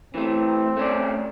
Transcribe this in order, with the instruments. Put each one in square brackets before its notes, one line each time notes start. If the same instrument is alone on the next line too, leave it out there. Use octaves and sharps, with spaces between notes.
[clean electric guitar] E3 A3 [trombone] C4
[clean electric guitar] A3 C#4 D5